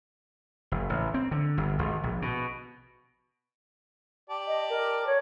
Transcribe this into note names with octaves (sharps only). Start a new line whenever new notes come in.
F#1
A1
C4
D3
G1
G#1
A#1
B2
G4 D5 A5
D#5
A#4
C#5